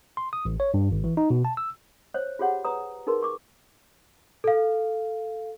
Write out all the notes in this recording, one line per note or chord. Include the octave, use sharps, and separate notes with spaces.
C6
D#6
A1
C#5
G2
G#1
E3
D#4
B2
A5
E6
C5 C#5
F4 G4 G#4 C#5 F#5
B4 C#5 A#5 D#6
D#4 G#4 A#4 B4 C6
C#6 D6
A4 F5